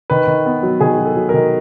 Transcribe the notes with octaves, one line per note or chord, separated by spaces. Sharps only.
D#3 B4
D#3
B3
F#3
D#3 G#4
F#3
A4
F#3
D#3 A#4